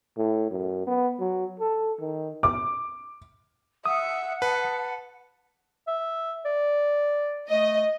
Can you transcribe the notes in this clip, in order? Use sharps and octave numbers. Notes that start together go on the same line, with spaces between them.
A2
F#2
B3
F#3
A4
D#3
D6
E5 F#5 D#6
B4 A5
E5
D5
A3 D#5